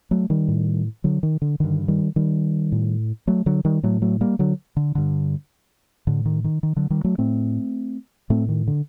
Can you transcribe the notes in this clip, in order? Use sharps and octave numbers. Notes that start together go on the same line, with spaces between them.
F#3 A3
D#3 G3
A2
D3 F#3
D#3
D3
G2 D3 D#3
D#3 G3
D#3 G3
A2
F#3 A3
D3 F#3
D#3 G3
A2 F#3 A3
F#3 A3
G3 A#3
D3 F#3
D3
G2 D3
A2 D3
D#3
D#3
D#3
D3 F#3
D#3 G3
F#3 A3
A2 A3 C4
A2 A3 C4
D#3
D3